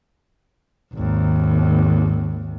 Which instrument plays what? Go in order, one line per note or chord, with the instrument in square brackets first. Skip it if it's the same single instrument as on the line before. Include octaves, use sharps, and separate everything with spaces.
[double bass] G#1 D#2